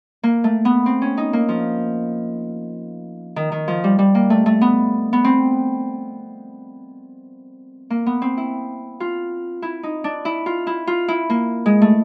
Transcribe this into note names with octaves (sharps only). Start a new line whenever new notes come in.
A#3
A3
B3
C4
C#4
D#4
A#3
F3
D#3
D#3
F3
G3
G3
A#3
A3
A3
B3
B3
C4
A#3
B3
C4
E4
F4
E4
D#4
D4
E4
F4
E4
F4
E4
A#3
G#3
A3